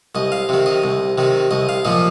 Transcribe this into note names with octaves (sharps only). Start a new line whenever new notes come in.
C2 D#5
F5
C3 D#3
D#5
C2
C3 D#3
C2 D#5
F5
A#2 F3 D#5